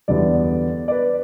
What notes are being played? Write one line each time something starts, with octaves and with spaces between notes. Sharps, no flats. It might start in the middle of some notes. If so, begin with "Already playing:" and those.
E2 D3 G3 B3 D5
D5
B4